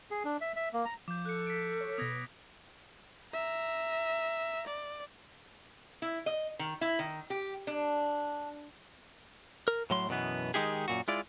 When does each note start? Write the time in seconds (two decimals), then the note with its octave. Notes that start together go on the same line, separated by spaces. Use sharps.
0.11 G#4
0.25 D4
0.41 E5
0.56 E5
0.73 A#3
0.85 A#5
1.08 F3 D6 G6
1.26 A4 F#6 C#7
1.47 B6 D7
1.81 C#5
1.98 B2 B3 D#6 G#6 A#6
3.33 E5 A#5
4.67 D5
6.02 E4
6.26 D#5
6.59 D#3
6.81 E4
6.99 D#3
7.30 G4
7.67 D4
9.68 A#4
9.90 A2 F#3 C6
10.09 F#2 B2 E3 B3
10.54 D#3 G#3 D#4 G4 G#4
10.88 F#2 A#2 F#4
11.08 G#3 E4 F4 D5